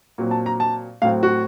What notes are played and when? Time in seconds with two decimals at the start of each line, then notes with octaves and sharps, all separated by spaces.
0.18 A#2 F#3 C4
0.31 A5
0.46 A#5
0.60 A5
1.02 A2 F#3 C4 F5
1.23 F#4